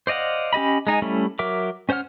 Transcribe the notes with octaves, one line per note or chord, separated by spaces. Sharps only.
C5 D5 D#5 F5 F#5
C#4 G4 D#5 B5
G#3 D#4 G#5
G3 A3 C#4 E4
F#3 A#4 E5 D6
C#4 C5 C#5 F#5 F6